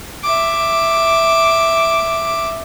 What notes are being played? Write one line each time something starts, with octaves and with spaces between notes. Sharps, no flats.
E5 D6